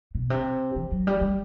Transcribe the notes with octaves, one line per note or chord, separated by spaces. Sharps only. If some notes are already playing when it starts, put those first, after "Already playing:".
B2
C3
E3
F#3
G3
G3